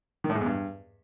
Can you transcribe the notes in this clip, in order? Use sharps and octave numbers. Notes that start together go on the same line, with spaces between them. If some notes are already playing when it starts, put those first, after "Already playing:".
D#3
A2
G#2
E2
G2